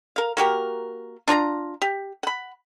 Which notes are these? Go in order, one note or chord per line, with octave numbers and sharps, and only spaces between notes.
A#4 F5
A#3 F#4 G4 A#4
D4 F4 C#5 A#5
G4
F#5 B5